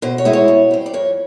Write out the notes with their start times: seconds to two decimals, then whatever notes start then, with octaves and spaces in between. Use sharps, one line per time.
0.02 B2 C5
0.18 C#5
0.25 G#3 B3 E4
0.33 C#5
0.48 B2
0.71 G3 C4
0.86 D5
0.93 F2 C#5